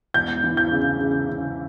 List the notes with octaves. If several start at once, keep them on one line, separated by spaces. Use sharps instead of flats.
E1 G6
E3
G6
C#3
C#3
C#3